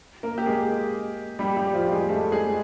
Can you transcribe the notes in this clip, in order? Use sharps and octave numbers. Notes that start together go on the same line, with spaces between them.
A#3 A#4
G4
G#3 G#4
G3 G4
G3 G4
F3 F4
G#3 G#4
A3 A4
G#3 G#4